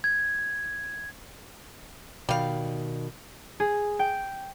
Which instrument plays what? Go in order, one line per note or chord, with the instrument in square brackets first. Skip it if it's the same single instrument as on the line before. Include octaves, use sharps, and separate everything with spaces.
[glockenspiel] G#6
[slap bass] B2 D#3 [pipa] G3 F5
[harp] G#4
G5